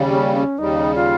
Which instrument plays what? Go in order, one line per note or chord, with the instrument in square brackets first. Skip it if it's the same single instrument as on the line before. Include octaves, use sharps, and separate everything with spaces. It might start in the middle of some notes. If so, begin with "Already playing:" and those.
Already playing: [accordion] D#2 C#3 G3
[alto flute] C#4
C#4
[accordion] D#2 C#3 G3 [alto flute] D#4
[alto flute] F4